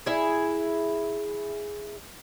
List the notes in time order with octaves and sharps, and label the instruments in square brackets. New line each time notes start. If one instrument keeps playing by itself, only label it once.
[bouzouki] E4 G#4